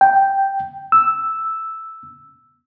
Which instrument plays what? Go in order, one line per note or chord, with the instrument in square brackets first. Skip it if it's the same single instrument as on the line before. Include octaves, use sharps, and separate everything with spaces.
[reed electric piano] G5
E6